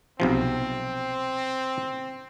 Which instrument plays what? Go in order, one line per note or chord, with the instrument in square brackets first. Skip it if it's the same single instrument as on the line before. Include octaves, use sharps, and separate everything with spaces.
[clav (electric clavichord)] B1 C3 F3 [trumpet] C4